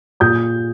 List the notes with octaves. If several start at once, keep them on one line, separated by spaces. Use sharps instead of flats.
A#2 D#6 G6